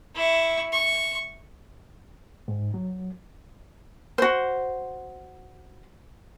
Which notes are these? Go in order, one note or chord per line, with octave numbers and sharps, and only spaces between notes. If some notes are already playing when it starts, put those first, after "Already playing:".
E4 C#6
C#6
G#2
F#3
F#4 C5